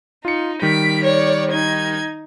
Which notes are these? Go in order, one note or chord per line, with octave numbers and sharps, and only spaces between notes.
D#4 F4 C#7
D#3 G3 B6 D7
C#5 D5
D#4 G#6